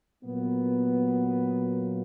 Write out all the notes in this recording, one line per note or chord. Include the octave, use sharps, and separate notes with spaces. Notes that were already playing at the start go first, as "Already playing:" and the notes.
A#2 F#3 A#3 B3